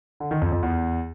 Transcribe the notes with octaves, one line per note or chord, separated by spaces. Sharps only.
D3
D#3
F2
F2
E2